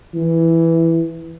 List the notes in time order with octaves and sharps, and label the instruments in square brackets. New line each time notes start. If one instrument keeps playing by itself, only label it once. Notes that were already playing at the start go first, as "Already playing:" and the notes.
[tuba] E3